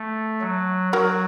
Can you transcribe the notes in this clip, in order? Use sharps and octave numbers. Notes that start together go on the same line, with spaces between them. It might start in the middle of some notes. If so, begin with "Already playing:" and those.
Already playing: A3
F#3
F#3 F#4 A#4